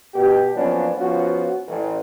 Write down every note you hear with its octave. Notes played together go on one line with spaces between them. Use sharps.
B2 G4
F3 F#3 A#3 B3 C#4 D4
F3 B3 C#4 F4 F#4
A1